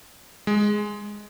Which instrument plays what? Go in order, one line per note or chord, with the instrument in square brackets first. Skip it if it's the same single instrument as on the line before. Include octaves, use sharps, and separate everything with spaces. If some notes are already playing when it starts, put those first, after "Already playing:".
[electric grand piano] G#3